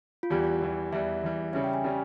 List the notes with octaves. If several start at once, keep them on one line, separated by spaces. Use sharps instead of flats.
F4
E2 E3 G3 G4
E2 E3 G3
E2 E3 G3 E5
E2 E3 G3
C#3 G3 C#4 E5
G5
G#5
C#3 G3 C#4